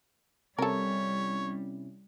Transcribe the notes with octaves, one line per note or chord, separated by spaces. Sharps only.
C3 G3 C#4 E4 A4 A#4 C#5